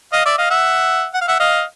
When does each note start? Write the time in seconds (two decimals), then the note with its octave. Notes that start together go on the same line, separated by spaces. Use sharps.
0.13 D#5 F5
0.25 D5 E5
0.38 D#5 F5
0.50 E5 F#5
1.14 F#5
1.21 F5
1.28 E5 F#5
1.40 D#5 F5